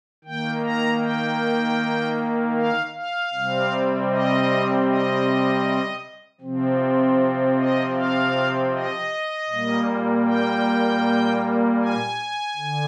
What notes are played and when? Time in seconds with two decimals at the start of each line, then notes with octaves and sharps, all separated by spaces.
0.24 D#3 A#3 G5
0.64 A#5
1.01 G5
2.56 F5
2.94 F5
3.33 C3 G3 C4
4.09 D#5
4.87 D#5
6.41 C3 F3 C4
7.56 D#5
7.95 F5
8.71 D#5
9.49 A#2 G3 A#3
10.26 G5
11.80 G#5
12.56 D3